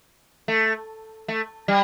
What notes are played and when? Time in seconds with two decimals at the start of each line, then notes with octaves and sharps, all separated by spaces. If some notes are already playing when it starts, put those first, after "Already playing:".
0.48 A3
1.28 A3
1.68 G3